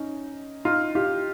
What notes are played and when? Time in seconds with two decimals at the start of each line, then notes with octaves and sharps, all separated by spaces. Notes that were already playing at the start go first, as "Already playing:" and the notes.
Already playing: C#4 D#4
0.65 D#4 F4
0.95 F4 G4